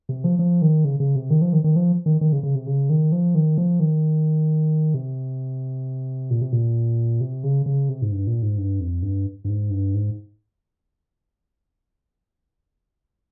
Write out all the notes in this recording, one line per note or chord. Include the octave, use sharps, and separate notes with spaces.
C3
F3
F3
D#3
C#3
C#3
C3
D#3
F3
D#3
D#3
F3
D#3
D#3
C#3
C#3
C3
C#3
D#3
F3
D#3
F3
D#3
C3
A#2
C3
A#2
C3
C#3
C#3
C3
G#2
G2
A#2
G#2
G2
F2
G2
G2
G#2
G2
G#2